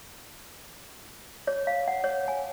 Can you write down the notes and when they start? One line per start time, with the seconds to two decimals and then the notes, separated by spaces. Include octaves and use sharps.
1.47 C#5
1.67 F5
1.88 F#5
2.04 C#5
2.28 G#5